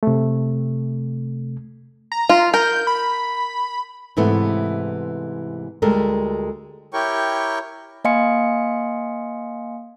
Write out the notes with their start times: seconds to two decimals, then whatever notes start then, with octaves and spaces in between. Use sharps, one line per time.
0.03 C3 A3
2.12 A#5
2.29 F4
2.54 A#4 G6
2.87 B5
4.17 G#2 C3 E3 A3 B3 E4
5.82 D2 G3 G#3 A4 A#4
6.93 E4 G4 A#4 C#5 G5 C#6
8.04 A#3 D#5 F5 G#5 C6 C#7